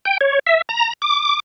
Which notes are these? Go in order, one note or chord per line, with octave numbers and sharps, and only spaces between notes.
G5
C#5
E5
A#5
D6